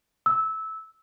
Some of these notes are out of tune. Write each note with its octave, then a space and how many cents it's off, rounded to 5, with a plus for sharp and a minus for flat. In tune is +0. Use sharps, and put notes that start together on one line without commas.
E6 -15